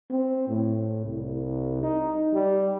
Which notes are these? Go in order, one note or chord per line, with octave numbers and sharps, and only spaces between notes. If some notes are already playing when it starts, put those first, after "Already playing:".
C4
A2
C2
D#4
G3